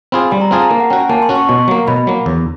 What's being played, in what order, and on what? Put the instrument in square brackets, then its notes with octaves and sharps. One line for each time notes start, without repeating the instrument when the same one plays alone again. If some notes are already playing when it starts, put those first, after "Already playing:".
[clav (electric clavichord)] C4 F4 G#4 [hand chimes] B5
[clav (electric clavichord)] G3 [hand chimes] C6
[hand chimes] A#5
[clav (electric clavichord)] C4 F4 G#4 [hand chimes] A5
[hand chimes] A#5
[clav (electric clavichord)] A#3
[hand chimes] F#5
[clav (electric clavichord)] C#4 F#4 [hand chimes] G5
[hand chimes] G#5
[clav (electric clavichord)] A#3 [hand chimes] A5
[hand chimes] C6
[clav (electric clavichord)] C#4 F#4
[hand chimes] C#6
[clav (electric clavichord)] B2 [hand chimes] C6
[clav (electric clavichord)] F#3 A#3
[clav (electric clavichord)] B2 [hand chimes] B5
[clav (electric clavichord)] F#3 A#3
E2